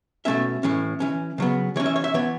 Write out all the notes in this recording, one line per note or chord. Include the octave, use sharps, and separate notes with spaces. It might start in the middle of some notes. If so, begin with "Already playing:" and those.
B2 A3 C#4 E5
A2 E3 C#4
E3 C#4
C#3 F#3 B3
E3 C#4 C#5
E5
C#5
E5
E3 B3 C#5